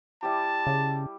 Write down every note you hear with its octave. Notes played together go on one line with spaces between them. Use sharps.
G3 E4 G4 A5
C#3